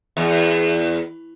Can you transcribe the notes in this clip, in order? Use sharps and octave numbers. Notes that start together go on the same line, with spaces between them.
E2